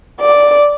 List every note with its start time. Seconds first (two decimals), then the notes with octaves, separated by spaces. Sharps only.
0.20 D5